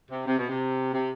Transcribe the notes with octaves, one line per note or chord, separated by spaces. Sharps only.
C3
C3
B2
C3
C3